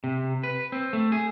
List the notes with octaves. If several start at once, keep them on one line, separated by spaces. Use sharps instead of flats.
C3
B4
C4
A3
G#4